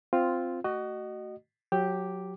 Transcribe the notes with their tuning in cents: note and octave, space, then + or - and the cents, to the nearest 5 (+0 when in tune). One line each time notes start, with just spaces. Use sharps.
C4 -5 F4 +0
A3 +10 F#4 +20 D#5 -25
F#3 -15 G4 +0 D6 +0